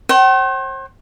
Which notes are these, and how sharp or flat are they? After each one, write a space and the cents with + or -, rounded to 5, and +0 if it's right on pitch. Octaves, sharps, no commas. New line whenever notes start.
C5 +40 G5 -45